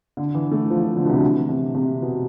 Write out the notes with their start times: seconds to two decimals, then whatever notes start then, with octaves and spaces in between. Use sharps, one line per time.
0.17 D3
0.34 E3
0.51 A3
0.70 F3
0.83 F3
0.96 D3
1.05 B2
1.10 C3
1.23 E3
1.49 C3
1.75 C3
2.02 B2